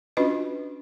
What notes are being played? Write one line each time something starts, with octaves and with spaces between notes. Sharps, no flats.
C#4 D4 F4 F#4 B4 D#5